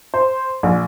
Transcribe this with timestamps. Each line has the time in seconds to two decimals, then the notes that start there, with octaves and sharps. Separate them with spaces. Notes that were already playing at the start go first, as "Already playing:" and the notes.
0.14 C5
0.63 A#1